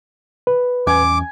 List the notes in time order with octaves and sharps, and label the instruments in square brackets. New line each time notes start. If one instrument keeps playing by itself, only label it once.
[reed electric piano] B4
[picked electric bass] E2 C#4 [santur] G#5 [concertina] D6